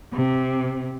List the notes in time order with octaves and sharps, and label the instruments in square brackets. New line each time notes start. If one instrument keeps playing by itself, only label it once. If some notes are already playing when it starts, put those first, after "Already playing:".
[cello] C3